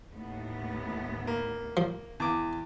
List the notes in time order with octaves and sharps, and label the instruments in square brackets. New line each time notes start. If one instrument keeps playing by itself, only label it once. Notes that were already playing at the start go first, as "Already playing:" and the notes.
[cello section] D#2 A2 B3
[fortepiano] A#3
[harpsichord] F3
[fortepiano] E2 D6